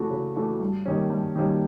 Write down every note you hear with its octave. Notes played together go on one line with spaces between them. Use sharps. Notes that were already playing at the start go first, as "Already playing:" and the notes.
Already playing: C#3 E3 A3 D4 F#4
C#3
E3 A3 D4 F#4
G2
D#3 G3 A#3 C#4
G2
D#3 G3 A#3 C#4